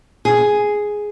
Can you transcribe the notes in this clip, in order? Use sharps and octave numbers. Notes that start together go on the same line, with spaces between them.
G#4